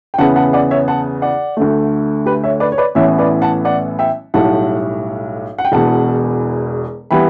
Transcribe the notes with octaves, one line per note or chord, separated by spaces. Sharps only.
G5
E2 C#3 E3 B3 F#5 A5
F#5 A5
D5 F#5
C#5 E5
F#5 A5
D5 F#5
D2 D3 A3
G4 B4
C#5 E5
B4 D5
C#5
B4 D5
A1 A2 E3 B3 C#5 E5
B4 D5
F#5 A5
D5 F#5
E5 G5
B1 A2 G3 F#5 A5
F#5
G5
E1 E2 B2 F#5 A5
E3 G3 B3 G5 B5